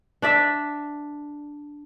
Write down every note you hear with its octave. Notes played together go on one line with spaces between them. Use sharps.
D4 D5 E5